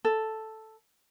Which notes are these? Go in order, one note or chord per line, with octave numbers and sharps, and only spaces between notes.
A4